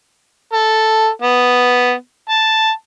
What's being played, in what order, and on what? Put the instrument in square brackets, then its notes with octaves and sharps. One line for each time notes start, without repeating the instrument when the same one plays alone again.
[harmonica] A4
B3
A5